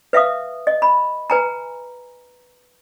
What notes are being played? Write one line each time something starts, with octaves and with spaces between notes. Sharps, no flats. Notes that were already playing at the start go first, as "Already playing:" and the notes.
B4 E5 F5 D#6
D#5
B5
B4 G#5 A#5